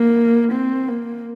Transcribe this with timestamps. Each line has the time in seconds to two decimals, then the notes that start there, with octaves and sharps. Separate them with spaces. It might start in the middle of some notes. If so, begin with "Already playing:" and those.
Already playing: A#3
0.52 C4
0.88 A#3